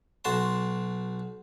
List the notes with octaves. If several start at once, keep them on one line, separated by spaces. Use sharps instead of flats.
B1 F#4 A5 C6